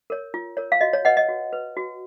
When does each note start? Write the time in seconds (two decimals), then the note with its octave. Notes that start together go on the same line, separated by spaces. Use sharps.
0.10 A#4 C#5
0.34 F4
0.57 A#4 C#5
0.72 F5
0.81 F#4 D#5
0.93 C#5
1.05 B4 D#5 F#5
1.17 D#5
1.29 F#4
1.53 B4
1.77 F#4